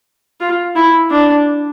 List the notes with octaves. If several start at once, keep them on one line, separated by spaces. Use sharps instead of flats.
F4
E4
D4